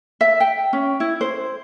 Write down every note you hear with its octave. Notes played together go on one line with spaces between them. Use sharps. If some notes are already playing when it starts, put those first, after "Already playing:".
E5
G5
C#4
E4
C5